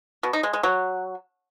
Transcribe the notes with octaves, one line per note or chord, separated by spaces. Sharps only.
B2
D#4
G#3
G#3
F#3